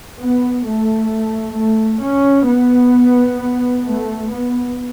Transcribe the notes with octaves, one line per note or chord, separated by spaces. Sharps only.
B3
A3
A3
C#4
B3
A3
B3